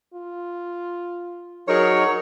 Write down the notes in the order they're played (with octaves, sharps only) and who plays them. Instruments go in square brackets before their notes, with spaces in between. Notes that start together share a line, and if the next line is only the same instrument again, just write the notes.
[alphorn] F4
[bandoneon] F#3 D#4 A#4 [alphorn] F#4 [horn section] G#4 C#5